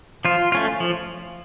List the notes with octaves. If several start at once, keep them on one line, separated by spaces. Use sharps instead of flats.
F3 F4
A3 C#4 F4
F3